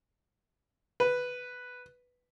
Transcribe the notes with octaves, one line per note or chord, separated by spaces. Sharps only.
B4